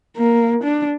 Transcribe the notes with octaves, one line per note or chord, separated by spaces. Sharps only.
A#3
D4